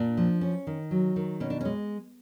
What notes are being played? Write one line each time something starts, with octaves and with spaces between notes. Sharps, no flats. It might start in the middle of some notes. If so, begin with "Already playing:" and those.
Already playing: A#2 D4
F3
C#4
D#3
F#3
D#3
B2 C#4
D4
C#4
G#3